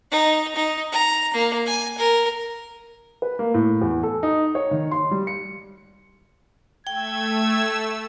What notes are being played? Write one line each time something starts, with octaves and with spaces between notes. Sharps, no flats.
D#4
D#4
A#5
A#3
G#5
A#4
B4
A#3
A2
E2
A4
D#4
C#5
D#3
C6
G3
C#7
A3 G5 E6 G#6